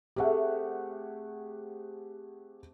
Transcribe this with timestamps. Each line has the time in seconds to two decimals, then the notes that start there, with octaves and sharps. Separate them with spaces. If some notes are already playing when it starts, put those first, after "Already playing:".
0.16 C3 A3 G4 G#4 F#5